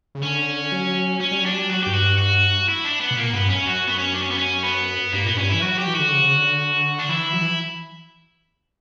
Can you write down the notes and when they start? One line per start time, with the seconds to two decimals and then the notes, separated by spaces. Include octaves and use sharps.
0.15 C#3
0.22 D3 C#4
0.72 F#3
1.20 C#4
1.31 G3
1.42 F#3 D4
1.53 G3
1.69 F#3 F#4
1.83 G2 G4
1.94 F#4
2.02 G2
2.18 F#4
2.68 E4
2.85 D4
3.01 B3
3.11 B2
3.17 A#2 A#3
3.33 G2 B3
3.49 F#2 C#4
3.65 F#2 F#4
3.87 B3
3.99 C#4
4.15 D4
4.23 C#4
4.31 B3
4.38 C#4
4.64 B3
5.13 G2 A#3
5.25 A#2 B3
5.36 G2 C#4
5.50 E3 E4
5.62 F#3 F#4
5.75 F#3 G4
5.87 E3
5.95 D3 F#4
6.12 C#3
6.36 D3
6.99 D4
7.09 E3 E4
7.33 F#3
7.42 E3